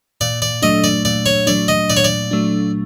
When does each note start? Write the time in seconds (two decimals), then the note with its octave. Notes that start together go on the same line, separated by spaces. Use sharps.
0.21 A#2 D5
0.42 D5
0.62 F#3 A3 D4 D#5
0.84 D5
1.05 A#2 D5
1.26 C#5
1.47 F#3 A3 D4 D5
1.68 D#5
1.90 A#2 D5
1.97 C#5
2.04 D5
2.31 F#3 A3 D4